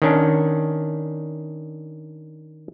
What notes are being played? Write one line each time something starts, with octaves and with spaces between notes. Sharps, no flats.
D#3 C#4 D4